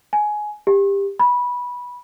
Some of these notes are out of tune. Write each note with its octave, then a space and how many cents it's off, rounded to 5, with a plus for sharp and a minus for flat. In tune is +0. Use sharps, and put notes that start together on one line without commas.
G#5 +15
G4 +20
B5 -15